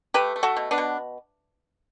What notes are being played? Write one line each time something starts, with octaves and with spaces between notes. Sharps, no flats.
A3 G4 B4
A3
F#4 A4
B2
B3 D4
B2